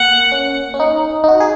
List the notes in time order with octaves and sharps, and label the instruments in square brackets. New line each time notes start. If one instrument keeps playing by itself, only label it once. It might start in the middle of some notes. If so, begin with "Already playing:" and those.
Already playing: [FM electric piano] A#3 [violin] F#5
[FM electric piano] C#4
C#4
D#4
D#4
F#4
G#4